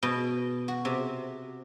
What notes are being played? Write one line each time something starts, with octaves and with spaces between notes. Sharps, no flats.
B2
F#4
C3